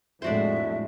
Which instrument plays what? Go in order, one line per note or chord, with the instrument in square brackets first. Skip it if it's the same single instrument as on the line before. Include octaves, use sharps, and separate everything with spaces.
[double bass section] F2 A2 G#3 [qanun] D4 F#4 C5 [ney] E5